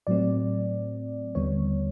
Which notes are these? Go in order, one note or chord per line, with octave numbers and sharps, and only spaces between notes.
A2 F#3 A3 C4 D5
D#2 D3 G3 B3 C#5